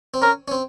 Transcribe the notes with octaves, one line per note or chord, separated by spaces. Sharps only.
C4
C#4 A#4
C#4
C4